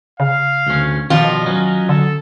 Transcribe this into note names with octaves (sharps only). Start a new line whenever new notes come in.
C#3 F5
D2 C#4
B2 D#3 F3 G3 F4 D#5
F#3 C#4
D3 A4